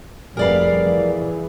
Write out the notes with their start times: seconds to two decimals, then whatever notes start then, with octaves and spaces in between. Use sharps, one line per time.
0.37 F1 G3 G#4 A#4 B4 D5 F5
0.86 E3